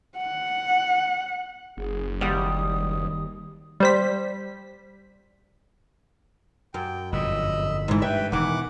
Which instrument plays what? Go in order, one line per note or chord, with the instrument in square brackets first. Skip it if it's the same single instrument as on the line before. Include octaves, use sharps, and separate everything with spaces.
[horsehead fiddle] F#5
[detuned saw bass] F#1 [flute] G#4
[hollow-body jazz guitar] D#2 F#5 [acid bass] G3 [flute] D#6
[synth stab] G3 C5 B6
[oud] F#2 [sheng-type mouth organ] G5
[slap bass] G1 F2 A#2 [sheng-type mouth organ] D#5 B5 E6
[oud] G#2 E3
[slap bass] G2 [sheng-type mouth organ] B4 G5 [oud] E5
[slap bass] E1 [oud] D#3 E3 [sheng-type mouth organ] F#5 D6